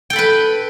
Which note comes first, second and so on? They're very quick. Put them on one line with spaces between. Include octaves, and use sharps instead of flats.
G5 A4 B5 B4